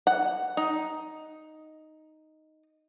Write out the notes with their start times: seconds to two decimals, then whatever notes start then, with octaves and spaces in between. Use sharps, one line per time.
0.07 F#5
0.57 D#4